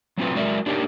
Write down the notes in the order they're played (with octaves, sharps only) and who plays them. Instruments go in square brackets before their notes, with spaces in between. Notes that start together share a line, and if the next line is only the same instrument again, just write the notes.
[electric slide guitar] F#3 A3 C4 D#4 F4 B4
F#3 G#3 A#4 D5 E5
D4 D#4 G4 A#4 C#5